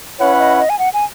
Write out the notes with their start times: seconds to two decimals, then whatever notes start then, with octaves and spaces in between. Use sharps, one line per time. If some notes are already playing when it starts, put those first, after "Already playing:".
0.19 C#4 E4 B4 C#5 F#5
0.39 D#5
0.59 D#5
0.70 G#5
0.79 F#5
0.94 G#5